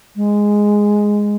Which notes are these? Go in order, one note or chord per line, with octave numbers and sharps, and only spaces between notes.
G#3